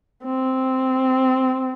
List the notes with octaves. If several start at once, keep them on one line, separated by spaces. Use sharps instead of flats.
C4